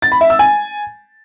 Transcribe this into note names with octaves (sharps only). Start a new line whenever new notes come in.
A6
B5
E5
E6
G#5